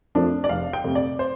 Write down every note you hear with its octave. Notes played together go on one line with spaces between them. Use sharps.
F2 F3 A3 D4
D5
F1 F5
G5
F2 C3 A3
D5
C5